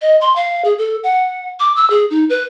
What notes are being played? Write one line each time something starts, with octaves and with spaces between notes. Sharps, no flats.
D#5
C6
F5
G#4
A4
F#5
D6
E6
G#4
D#4
B4